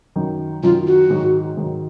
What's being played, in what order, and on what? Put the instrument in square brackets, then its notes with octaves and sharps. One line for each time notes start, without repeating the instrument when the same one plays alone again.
[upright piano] F#2 D#3 F#3
[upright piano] F#2 D#3 F#3 [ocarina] F4
[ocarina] F#4
[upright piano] G#2 D#3 F#3
G#2 D#3 F#3